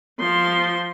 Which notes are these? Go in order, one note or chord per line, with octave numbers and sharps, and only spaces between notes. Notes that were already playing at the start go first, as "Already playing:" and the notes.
F3 C6